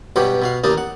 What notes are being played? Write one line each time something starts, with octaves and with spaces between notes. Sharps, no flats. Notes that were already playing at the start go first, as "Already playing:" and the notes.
G2 B2 F#3 F#4 G4 C#5
B2 F#4 F5
A1 D#2 A#3 D4 D#4 A5
F#5